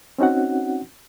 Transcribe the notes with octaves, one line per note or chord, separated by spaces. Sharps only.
C4 C#4 D#4 F#4 F#5